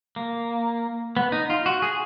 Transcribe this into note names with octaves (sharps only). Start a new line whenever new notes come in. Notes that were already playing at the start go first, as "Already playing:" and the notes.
A#3
B3
D#4
F4
F#4
G#4